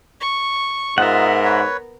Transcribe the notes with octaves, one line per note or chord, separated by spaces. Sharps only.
C#6
G#2 B3 F4 A#4 D#5 E5 F#5
B4 C#5